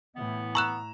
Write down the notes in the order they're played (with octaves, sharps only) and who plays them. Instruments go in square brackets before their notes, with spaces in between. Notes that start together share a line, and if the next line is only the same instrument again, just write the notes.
[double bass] A2 E4 [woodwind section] E3 A3 B3
[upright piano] A#5 E7 [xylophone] C#6 E6 F#6